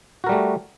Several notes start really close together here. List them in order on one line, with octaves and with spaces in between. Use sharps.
F#4 A#4 G3 A3